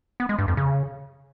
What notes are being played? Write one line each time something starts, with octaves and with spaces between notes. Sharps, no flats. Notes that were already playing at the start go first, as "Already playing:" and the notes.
B3
G#3
G2
F2
C#3